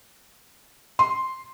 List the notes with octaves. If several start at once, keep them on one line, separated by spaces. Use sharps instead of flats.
C6